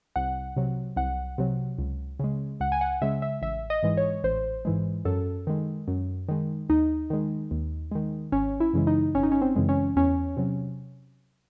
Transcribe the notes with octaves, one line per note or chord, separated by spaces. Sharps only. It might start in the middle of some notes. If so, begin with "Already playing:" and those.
C2 F#5
C3 F#3
C2 F#5
C3 F#3
C#2
C#3 G#3
C#2 F#5
G#5
F#5
C#3 G#3 E5
E5
A1 E5
D#5
G#2 E3 G#3
C#5
A1 C5
G#2 E3 G#3
F#2 A4
D#3 G#3
F#2
D#3 G#3
D#2 D#4
D#3 G#3
D#2
D#3 G#3
G#1 C#4
E4
F#2 C#3 E3 G#3
D#4
G#1 C#4
D#4
C#4
C4
F#2 C#3 E3 G#3
C#4
E2 C#4
C3 F#3